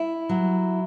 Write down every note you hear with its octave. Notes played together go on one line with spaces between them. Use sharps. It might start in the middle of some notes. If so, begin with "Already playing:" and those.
Already playing: E4
F#3